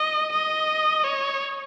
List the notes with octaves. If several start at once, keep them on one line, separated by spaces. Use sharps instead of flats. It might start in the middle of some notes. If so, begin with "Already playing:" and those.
Already playing: D#5
D#5
C#5